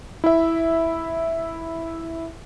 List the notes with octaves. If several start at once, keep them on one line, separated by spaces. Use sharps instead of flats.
E4 E5